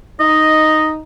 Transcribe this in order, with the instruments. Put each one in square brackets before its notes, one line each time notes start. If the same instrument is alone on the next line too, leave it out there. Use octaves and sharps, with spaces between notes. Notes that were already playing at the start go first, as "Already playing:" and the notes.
[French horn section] D#4 [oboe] D#5